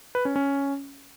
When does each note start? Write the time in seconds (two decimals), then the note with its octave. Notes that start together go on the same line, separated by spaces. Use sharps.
0.15 B4
0.25 C#4
0.36 C#4